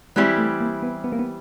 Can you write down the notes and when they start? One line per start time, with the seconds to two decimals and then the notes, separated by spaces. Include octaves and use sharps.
0.16 E3 G3 G#3 C4 E4 G4
0.38 A3
0.61 A#3
0.83 B3
1.04 B3
1.12 A#3
1.19 B3